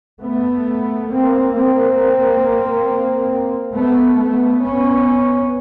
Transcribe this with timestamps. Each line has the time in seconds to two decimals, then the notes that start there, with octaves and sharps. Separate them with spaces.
0.22 A3 B3
1.09 A#3 C4
1.54 A#3 C4
3.75 A3 B3
4.18 A3 B3
4.62 B3 C#4